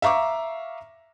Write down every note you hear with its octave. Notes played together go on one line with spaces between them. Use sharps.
E5 F5 A#5 C#6 D6